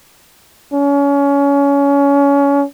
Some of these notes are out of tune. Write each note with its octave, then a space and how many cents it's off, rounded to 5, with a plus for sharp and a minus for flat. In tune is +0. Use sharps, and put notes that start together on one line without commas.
C#4 +25